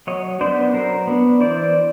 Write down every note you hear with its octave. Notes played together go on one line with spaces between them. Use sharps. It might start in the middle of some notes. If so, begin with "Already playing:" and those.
F#3 C#5 D#5
B3 D4 C5 D5
F#3 A#4 C5
B3 D4
E3 C5 D5